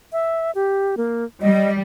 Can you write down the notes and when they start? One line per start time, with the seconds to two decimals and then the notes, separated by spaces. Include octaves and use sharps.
0.12 E5
0.55 G4
0.97 A#3
1.42 G3 D#5